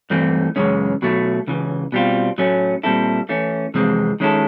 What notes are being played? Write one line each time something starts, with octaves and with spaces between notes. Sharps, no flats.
G2 E3 A3 C4
F#2 C#3 E3 G#3 C#4
B2 F#3 A3
C#2 C#3 E3
B2 G3 C4 F4
A2 F#3 A3 C#4
A#2 G3 C4 E4 A4
E3 A3 C#4
F2 C3 E3 G#3 C4
D#3 G#3 C#4 E4 A4